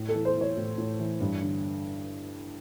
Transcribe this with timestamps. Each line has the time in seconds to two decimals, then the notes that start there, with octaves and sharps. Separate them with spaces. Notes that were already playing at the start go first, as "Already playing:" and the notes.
Already playing: A2
0.09 A4
0.14 E3
0.25 C5
0.36 E3
0.41 C#5
0.57 A2
0.78 A2
0.99 E3
1.20 G2
1.41 D3